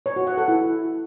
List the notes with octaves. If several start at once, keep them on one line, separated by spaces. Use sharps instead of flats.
C#5
F#4
F#5
A4
E4